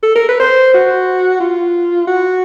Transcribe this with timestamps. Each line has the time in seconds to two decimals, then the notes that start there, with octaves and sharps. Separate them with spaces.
0.03 A4
0.15 A#4
0.28 B4
0.40 C5
0.74 F#4
1.40 F4
2.07 F#4